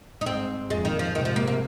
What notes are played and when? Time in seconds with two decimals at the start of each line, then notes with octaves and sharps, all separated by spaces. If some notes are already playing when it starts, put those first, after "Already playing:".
0.21 D#4
0.26 G#2 C4
0.70 F2 A#2 G#3
0.85 D#3
0.99 F3
1.15 G#2 C3 D#3
1.25 F3
1.36 A#3
1.48 A#3